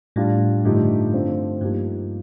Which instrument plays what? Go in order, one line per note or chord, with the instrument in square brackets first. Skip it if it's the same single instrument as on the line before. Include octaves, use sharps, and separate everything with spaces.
[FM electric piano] A2 [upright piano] G3 D4 F4
[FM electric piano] G2 [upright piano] D3 F3 A3 D#4 G4
[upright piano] D3 A3 C4 F4
[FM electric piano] G2 [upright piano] F3 A#3 D#4 G4